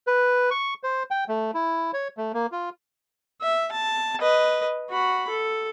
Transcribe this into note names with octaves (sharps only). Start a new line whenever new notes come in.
B4
C#6
C5
G5
A3
E4
C#5
A3
A#3
F4
E5
A5
B4 D#5
F#4 B5
A4